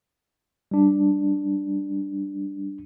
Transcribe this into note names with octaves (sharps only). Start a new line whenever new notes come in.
G3 D4